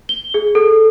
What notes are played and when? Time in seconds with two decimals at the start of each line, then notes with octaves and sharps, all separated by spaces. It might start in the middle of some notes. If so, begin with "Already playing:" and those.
0.09 G7
0.34 G#4
0.55 A4